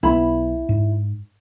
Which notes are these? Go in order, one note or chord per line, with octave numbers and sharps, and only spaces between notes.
B1 B3 E4 B5
G#2